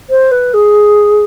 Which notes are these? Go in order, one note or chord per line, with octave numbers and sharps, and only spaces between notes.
C5
B4
G#4